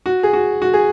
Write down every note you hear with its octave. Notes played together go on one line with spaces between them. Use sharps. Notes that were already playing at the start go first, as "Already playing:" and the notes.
F#4
G#4
F#4
F#4
G#4